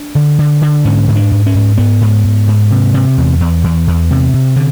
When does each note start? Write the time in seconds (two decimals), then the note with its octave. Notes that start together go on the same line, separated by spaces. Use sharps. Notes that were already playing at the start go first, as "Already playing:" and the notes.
Already playing: D4
0.15 D3
0.39 D3
0.62 D3
0.85 G#2 C#4
1.08 G#2
1.16 D4
1.31 G#2
1.47 C#4
1.55 G#2
1.78 G#2 B3
2.01 G#2
2.24 G#2
2.47 G#2
2.70 C3
2.94 C3
3.18 E2
3.40 E2
3.64 E2
3.87 E2
4.11 C3
4.34 C3
4.56 D3